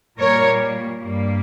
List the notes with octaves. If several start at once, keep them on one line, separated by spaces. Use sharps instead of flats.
A#2 G3 A#3 A#4 C#5
G2 G3 A#3